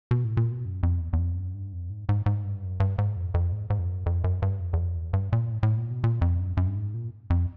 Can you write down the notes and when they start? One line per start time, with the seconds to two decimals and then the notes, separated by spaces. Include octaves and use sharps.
0.11 B2
0.24 A2
0.37 A#2
0.52 B2
0.65 F#2
0.83 F2
1.00 E2
1.13 E2
1.19 F2
1.36 F#2
1.55 G2
1.73 F2
1.90 G#2
2.09 G#2
2.26 G#2
2.44 G2
2.62 F#2
2.80 G2
2.98 G#2
3.16 F2
3.34 F2
3.52 G#2
3.70 G#2
3.79 F2
3.88 F#2
4.06 F2
4.24 F#2
4.42 G2
4.60 F2
4.73 E2
4.77 F2
4.96 E2
5.13 G2
5.33 A#2
5.51 A2
5.63 A2
5.77 A#2
5.91 B2
6.04 A#2
6.21 F2
6.40 F#2
6.57 F#2
6.67 G2
6.76 G#2
6.94 A#2
7.30 F2